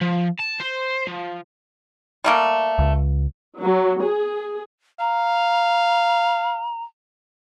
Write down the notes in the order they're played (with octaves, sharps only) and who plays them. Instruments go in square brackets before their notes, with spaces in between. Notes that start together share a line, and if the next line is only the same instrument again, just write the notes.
[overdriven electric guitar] F3
A5
C5
F3
[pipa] G3 A3 A#3
[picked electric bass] C#2
[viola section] F#3
G#4
[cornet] F5 [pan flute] A#5